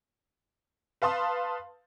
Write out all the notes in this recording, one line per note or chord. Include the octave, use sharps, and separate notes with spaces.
B4 F5 A5 C6 D#6